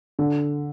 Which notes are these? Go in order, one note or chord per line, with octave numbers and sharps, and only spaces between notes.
D3